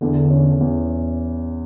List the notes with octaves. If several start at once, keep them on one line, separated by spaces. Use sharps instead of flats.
E2 D3
C#4
E2